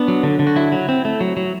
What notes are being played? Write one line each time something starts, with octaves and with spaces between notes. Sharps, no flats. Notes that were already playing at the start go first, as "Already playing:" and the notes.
Already playing: B3 D4
F#3
D3
D3
F#4
F#3 E4
F#3
C4
A3
F#3
F#3